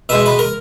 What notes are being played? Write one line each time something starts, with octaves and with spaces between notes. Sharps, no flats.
B2 G#3 E5
B4
A#4